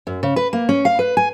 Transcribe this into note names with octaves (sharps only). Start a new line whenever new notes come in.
F#2
C#3
B4
A#3
C#4
F5
B4
G#5